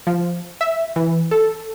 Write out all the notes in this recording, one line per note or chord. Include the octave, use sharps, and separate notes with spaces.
F3
E5
E3
A4